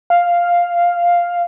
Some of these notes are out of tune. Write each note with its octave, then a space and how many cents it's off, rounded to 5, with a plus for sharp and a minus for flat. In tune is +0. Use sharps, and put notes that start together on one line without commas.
F5 +0